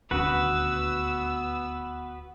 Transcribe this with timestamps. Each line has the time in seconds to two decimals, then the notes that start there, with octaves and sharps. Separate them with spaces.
0.11 D#1 D2 B3 C#4 F#4 B4 E6